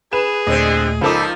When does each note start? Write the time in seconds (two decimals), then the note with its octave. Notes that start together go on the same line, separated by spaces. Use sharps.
0.13 G#4 B4 E7
0.47 D#2 A#2 D3 A3 C4 D#5
1.01 C#2 F3 A#3 D#4 A4 B5 D6 B6